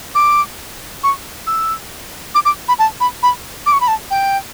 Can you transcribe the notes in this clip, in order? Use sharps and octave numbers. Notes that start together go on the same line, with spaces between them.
D6
C#6
E6
D6
D6
B5
A5
B5
B5
D6
C#6
B5
A5
G5